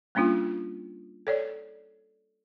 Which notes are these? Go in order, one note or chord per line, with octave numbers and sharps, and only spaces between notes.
G3 A#3 C#4 D4 F4
A4 C#5 D5